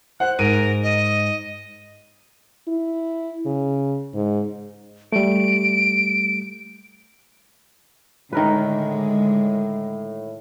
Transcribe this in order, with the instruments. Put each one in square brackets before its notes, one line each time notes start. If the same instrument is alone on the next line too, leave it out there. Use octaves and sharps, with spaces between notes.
[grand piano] C5 F#5 [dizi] F#6
[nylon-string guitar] G#2 [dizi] A#4 [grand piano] D7 D#7
[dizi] D#5
[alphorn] E4
C#3
G#2
[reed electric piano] G3 A3 [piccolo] D7
[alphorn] A2 [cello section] D3 G#3 [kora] D#3 A#4 B4